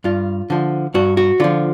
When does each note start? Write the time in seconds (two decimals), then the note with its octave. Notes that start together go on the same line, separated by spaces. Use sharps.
0.04 G2 F4
0.50 D3 F3
0.94 G2 F#4
1.17 F#4
1.40 D3 F3 F4